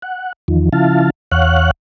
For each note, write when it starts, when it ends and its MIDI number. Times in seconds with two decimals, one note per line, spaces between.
0.02 0.33 78
0.48 0.69 40
0.48 0.69 51
0.48 0.69 53
0.73 1.10 49
0.73 1.10 53
0.73 1.10 64
0.73 1.10 77
0.73 1.10 81
1.32 1.71 40
1.32 1.71 73
1.32 1.71 77
1.32 1.71 78
1.32 1.71 90